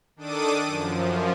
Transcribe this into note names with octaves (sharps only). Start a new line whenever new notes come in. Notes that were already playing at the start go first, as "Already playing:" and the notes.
D#3 D4 A4 D6 D#6 D#7
F#2 F3